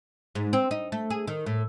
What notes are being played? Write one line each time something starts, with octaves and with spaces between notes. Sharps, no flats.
G#2
C4
D#4
A3
G#4
D#3
A2